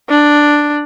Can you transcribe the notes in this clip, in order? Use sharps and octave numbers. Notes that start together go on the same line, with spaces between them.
D4